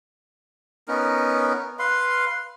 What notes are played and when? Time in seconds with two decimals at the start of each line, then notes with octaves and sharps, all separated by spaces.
0.88 B3 C#4 D#4 A#4
1.79 B4 F5 C6